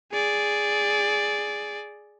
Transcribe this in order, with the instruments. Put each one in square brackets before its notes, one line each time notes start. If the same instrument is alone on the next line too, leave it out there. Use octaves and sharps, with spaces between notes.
[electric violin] G#4 D5